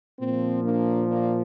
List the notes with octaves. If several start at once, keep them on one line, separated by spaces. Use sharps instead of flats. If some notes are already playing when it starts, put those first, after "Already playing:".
A#2 F3 C4
A#3 D4
A#3 D4